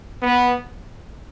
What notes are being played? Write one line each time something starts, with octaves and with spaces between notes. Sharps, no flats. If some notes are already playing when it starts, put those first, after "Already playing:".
B3